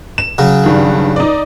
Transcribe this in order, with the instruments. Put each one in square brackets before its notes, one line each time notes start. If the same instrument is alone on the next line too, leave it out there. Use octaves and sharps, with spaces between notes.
[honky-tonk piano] E7
[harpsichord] C#3 F#3
[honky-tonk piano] G2 D#3
D#4 D5